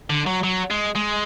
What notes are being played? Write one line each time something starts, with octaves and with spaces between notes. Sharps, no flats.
D3
F#3
F#3
G#3
G#3